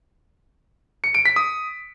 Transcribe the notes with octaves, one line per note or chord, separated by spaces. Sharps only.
C#7
D7
B6
D#6